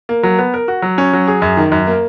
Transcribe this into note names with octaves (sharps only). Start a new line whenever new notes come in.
A#3
F#3
B3
A#4
F#4
F#3
C#4
F#3
G#4
F#2
D#3
F#2
A#3